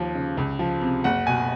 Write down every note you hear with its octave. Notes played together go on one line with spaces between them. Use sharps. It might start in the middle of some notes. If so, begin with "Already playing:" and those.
Already playing: D#2 F3
C#3
C#2
F3
C3
F#1 F#5
B2 G#5